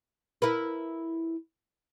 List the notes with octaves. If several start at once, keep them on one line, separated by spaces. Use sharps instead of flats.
E4 A#4 B4